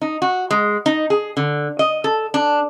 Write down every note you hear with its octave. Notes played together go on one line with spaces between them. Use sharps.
D#4
F#4
G#3
D#4
G#4
D3
D#5
A4
D4